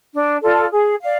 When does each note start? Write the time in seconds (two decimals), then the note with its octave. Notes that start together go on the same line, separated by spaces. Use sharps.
0.13 D4
0.42 F4 A4 D5
0.71 G#4
1.00 D5 F5